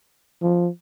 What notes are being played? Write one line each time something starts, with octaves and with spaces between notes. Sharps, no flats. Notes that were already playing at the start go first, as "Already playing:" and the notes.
F3